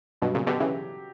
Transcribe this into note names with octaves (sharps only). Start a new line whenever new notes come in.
G2 B2 F#3
A#2 C#3
B2 D3 G4
C#3 E3